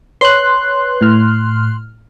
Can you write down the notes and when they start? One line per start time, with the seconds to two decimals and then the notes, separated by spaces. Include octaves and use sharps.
0.21 B4 C#5 C6 F#6
1.01 A2 F6